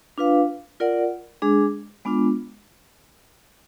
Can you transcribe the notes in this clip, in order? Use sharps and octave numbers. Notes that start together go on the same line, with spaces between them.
D4 F4 B4 F5
F4 A#4 D5 F#5
G#3 D4 G#4
G#3 B3 D4 F4